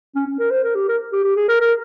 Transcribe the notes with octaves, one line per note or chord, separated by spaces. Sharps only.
C#4
C#4
A#4
C5
A#4
G4
A#4
G4
G4
G#4
A#4
A#4